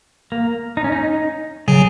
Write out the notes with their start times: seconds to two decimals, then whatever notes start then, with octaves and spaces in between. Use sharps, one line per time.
0.32 A#3
0.77 D#4
0.84 C#4
0.92 D#4
1.68 C#3 F#3 G#4